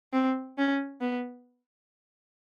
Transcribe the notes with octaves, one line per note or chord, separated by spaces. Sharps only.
C4
C#4
B3